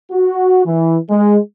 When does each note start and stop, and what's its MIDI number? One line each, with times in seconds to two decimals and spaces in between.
0.12 0.65 66
0.66 0.98 52
1.10 1.38 56